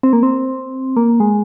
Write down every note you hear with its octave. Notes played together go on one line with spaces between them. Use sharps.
C4
A#3
C4
A#3
G#3